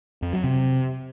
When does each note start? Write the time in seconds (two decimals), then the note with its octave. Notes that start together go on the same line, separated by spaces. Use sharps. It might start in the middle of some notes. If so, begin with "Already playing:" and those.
0.22 F2
0.33 F#3
0.44 C3